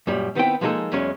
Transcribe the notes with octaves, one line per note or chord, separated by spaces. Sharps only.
F#2 A#2 G3
D#3 B3 C4 E4 G5
F3 G#3 A#3 D#4 G#4 A4
E2 F#3 G#3 C#4